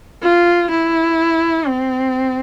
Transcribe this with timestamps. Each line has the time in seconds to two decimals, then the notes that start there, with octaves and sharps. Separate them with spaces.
0.22 F4
0.71 E4
1.67 C4